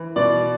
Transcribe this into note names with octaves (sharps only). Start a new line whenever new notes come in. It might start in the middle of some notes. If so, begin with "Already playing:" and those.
Already playing: E3
B2 D5